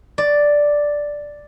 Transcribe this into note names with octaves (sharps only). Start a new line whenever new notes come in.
D5